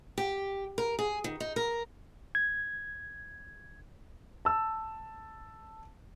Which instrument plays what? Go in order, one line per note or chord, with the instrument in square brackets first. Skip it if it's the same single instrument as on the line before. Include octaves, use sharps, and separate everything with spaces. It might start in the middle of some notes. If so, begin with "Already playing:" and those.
[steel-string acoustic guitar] G4
A#4
G#4
D#3
D#4
A#4
[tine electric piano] G#6
[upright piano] A5 E6